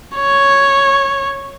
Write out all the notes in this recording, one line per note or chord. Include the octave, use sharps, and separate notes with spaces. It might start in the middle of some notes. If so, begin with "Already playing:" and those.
C#5